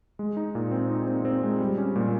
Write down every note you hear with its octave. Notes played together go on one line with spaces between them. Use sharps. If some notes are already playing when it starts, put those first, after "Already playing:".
G#3
D#4
A#2
C4
D#4
C4
C4
G#3
G3
C#4
A#2